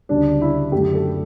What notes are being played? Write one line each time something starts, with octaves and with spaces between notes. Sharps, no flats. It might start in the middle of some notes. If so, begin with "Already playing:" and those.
D2 C#3 G3 D4
E4
F#2 D3 F#3 A3 G4
A4